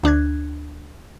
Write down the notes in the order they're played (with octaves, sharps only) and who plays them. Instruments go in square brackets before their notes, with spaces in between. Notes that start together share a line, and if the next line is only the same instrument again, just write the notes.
[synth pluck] D2 D4 F#6 G#6